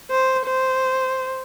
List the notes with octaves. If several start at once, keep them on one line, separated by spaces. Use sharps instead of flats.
C5
C5